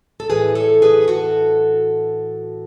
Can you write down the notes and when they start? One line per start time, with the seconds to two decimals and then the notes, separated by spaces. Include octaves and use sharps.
0.20 A4
0.30 A2 E3 G#4 B4
0.55 A4 C#5
0.82 G#4 B4
1.08 F#4 A4